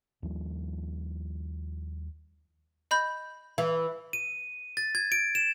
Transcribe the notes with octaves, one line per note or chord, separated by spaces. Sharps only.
D#2 F3 G3
D#5 B5 G6
E3
D#7
A6
G#6
D7
E7